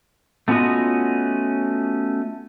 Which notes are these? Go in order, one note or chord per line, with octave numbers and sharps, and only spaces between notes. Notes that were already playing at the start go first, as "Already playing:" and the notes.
A3 B3 C#4 F4 F#4 D#5